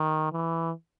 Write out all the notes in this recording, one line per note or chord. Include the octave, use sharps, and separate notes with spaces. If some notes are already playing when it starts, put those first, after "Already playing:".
Already playing: D#3
E3